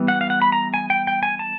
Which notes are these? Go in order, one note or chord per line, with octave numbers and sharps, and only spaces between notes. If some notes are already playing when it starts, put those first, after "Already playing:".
Already playing: E3 G3 B3
F#5
F5
F#5
B5
A#5
G#5
G5
G5
G#5
A5